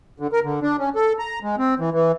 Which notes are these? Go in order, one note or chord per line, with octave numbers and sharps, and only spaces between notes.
D3
A#4
D3
D4
C#4
A4
A#5
G#3
C4
E3
E3